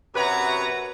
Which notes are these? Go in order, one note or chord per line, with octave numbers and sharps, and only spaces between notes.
F#2 C3 F#4 B4 C#5 A#5